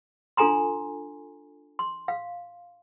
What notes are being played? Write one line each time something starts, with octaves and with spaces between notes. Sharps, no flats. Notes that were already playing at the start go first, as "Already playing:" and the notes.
D4 F4 A4 G#5 A#5 C6
C6
F5